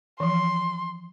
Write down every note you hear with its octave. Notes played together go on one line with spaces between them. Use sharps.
E3 F3 C6